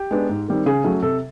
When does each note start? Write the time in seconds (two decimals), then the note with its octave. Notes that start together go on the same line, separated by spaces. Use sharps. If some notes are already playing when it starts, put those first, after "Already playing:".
Already playing: G4
0.11 G#3 B3 D4
0.29 G#2
0.48 D#3 G3 C4
0.66 C#3 G#4
0.84 F#3 A3 C#4
1.03 C3 A4